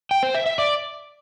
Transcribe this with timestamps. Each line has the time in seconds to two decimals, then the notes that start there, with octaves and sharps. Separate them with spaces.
0.11 G5
0.23 C5
0.35 E5
0.46 E5
0.58 D5